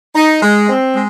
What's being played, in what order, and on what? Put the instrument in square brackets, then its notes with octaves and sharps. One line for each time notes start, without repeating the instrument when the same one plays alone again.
[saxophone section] D#4
G#3
C4
G#3